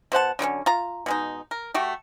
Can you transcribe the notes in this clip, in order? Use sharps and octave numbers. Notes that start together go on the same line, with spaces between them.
B2 C5 F#5 A5
D3 F#3 B3 C#4
F4 A#5
B2 G#3 D#4
A#4
A3 F#4 G4